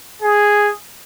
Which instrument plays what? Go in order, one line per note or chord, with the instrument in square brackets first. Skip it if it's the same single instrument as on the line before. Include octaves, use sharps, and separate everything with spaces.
[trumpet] G#4